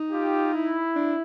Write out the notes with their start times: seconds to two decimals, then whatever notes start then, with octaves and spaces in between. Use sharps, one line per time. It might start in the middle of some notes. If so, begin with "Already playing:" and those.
Already playing: D#4
0.11 F4 G4
0.53 E4
0.95 D4